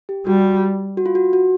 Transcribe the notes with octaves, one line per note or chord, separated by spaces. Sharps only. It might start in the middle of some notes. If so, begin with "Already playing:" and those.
G4
G3 F#4
F#4
F4
F#4
F#4